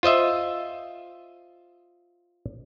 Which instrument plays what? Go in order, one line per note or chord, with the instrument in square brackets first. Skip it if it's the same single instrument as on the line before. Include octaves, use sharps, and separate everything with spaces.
[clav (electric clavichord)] F4 C5 D#5 E5